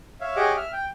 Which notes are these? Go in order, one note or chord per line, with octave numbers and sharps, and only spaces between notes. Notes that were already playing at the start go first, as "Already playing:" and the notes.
C#5 E5 F5
G4 G#4 C#5 D#5 F#5 D6
E5 F6
G5